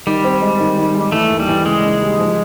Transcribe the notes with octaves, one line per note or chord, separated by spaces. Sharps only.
D#3 G3
C4
G#3
D#3
D#3
G#3
E3 A3
D#2
G3
E3
C#3 G#3
C#3
G3
F3